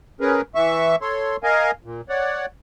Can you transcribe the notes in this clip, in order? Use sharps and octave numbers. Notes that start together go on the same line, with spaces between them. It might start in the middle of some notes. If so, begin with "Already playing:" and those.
C#4 G#4 A#4 B4
E3 E5 C#6
A4 C#5 C6
A#4 D#5 F5 G#5
A#2
C#5 D5 F#5